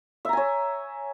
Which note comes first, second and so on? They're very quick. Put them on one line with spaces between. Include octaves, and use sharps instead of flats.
E5 A#5 G#5 C#5